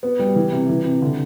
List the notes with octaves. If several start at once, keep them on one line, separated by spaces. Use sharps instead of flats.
B3
G3
E3
C3
E3
C3
D3